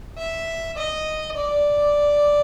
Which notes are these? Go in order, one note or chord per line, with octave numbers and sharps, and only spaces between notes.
E5
D#5
D5